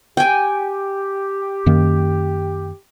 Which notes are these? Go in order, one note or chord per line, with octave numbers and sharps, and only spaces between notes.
G4 G5 G#5
F#2 D#3 A#3